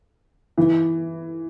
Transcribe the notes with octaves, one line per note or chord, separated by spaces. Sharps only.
E3